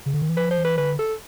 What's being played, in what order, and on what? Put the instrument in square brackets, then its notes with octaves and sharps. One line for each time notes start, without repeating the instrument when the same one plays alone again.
[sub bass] C#3
D3
D#3
E3
[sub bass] F3 [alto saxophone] B4
[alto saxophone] C5
[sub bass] E3
[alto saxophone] B4
[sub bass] D3 [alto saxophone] B4
[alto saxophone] A4